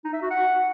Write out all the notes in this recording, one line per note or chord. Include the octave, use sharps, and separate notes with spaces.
D#4
E5
F#4
F#5